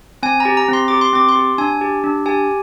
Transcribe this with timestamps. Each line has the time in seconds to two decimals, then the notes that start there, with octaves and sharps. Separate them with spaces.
0.23 C4 G#5
0.40 A#5
0.45 G4
0.57 A#5
0.68 C4
0.73 C6
0.88 G4 D6
1.01 C6
1.13 C4 D6
1.29 C6
1.36 G4
1.58 D4 G#5
1.81 G4
2.04 D4
2.26 G4 G#5